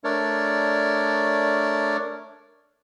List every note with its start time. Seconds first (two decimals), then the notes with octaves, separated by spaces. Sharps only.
0.04 A3 D4 A#4 C#5 D5